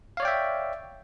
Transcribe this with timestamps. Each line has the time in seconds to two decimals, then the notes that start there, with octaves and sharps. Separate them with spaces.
0.17 F5
0.20 C#5
0.22 D5
0.25 G5
0.28 E5